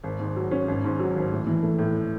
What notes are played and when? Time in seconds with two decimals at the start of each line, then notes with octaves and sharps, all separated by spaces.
0.04 G#1
0.19 G#2
0.36 F#3
0.51 C#4
0.68 G#1
0.84 G#2
0.99 F#3
1.16 G#1
1.32 A2
1.47 E3
1.63 A3
1.79 A2